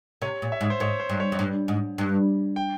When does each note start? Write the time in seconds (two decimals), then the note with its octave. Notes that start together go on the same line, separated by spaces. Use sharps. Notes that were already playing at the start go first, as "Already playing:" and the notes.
0.22 C3 C#5
0.42 A#2
0.52 E5
0.61 G#2
0.70 C5
0.80 G#2 C#5
1.00 C5
1.09 G2
1.20 C#5
1.32 F2
1.39 G2
1.68 G#2
1.98 G2
2.56 G5